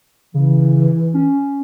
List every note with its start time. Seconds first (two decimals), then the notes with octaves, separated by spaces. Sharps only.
0.34 C#3 E3
1.14 C#4